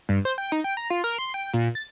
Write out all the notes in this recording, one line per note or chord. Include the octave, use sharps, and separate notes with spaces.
G2
C5
G5
D#4
G5
A#5
F4
A#4
C6
G5
A#2
A6